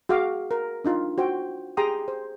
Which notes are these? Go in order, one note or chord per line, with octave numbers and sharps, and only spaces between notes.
F#4 G#4 F5 D6
A#4
D4 D#4 F4
F#4 C5 G5
G4 G#4 G5 A#5 C6 D#6
C5